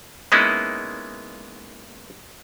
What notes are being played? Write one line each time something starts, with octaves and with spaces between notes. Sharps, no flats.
G#3 A#3 B3 C#4 D#4 E4